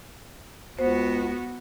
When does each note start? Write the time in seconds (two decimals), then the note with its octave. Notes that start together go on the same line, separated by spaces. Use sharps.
0.79 C#2 B3 F#4 C5